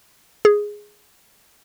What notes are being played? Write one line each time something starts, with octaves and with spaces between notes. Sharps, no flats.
G#4